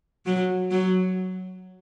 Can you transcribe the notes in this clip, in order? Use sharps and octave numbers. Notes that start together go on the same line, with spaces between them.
F#3
F#3